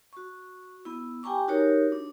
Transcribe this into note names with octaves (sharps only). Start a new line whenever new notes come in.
F#4 C#6
B3 E4
G4 G5 G#5 A#5 C#6 D6
D#4 F#4 G4 A#4 C#5
D4